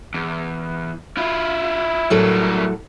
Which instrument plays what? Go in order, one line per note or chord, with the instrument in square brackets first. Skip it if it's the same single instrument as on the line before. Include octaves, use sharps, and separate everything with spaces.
[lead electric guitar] E2
E4 F4
[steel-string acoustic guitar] A2 F#3 A4 [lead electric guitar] G3 A#4